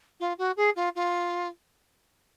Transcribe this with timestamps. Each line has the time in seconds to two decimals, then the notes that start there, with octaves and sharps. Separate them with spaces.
0.20 F4
0.38 F#4
0.57 G#4
0.76 F4
0.96 F4